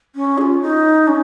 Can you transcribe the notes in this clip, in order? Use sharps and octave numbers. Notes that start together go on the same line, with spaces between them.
C#4
G#4
F4
D#4
C#4